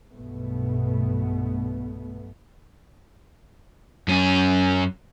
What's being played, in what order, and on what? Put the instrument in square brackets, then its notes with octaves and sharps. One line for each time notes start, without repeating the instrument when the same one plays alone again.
[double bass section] B1 G2 B2 A3 B3
[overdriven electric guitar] F#2 C#4